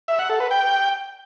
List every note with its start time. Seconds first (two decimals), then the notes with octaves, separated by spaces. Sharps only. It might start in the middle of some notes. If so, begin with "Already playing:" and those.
0.08 E5
0.19 F#5
0.29 A4
0.40 B4
0.51 G5